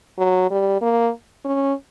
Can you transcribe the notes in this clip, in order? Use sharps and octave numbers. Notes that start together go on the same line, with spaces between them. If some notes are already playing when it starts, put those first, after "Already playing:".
F#3
G3
A#3
C#4